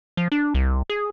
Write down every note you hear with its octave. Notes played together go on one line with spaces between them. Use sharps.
F3
D4
C2
G#4